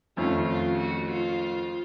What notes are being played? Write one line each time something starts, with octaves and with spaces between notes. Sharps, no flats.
F2 D#3 A3 C#4 F4
F4
F#4
F4